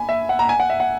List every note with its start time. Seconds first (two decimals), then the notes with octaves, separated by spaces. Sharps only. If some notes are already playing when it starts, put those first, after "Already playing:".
Already playing: G#5 B5
0.09 E5
0.29 F#5
0.39 A#5
0.49 G#5
0.60 F#5
0.70 E5
0.80 F#5